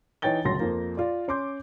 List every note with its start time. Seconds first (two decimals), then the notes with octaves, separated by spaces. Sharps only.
0.22 E3 D#4 C#5 G5 A6 G7
0.45 G1 C#2 F#3 C6 A#6
0.60 F2 F3 A#3
0.97 F4 D5
1.28 C#4 C6 D6 G6